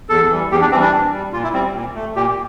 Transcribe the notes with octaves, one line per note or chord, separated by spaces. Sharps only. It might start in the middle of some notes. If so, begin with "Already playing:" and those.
E2 A4
E3 G3
E2 G4
D4
E3 G3 C4
D4
A#2
G3
A#2 F4
E4
G3 C4
A#2
A3
A#2 G4